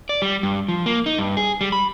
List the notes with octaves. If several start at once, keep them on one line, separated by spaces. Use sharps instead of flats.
D5
G3
G2
F3
A#3
D#4
G2
G#4
G3
B5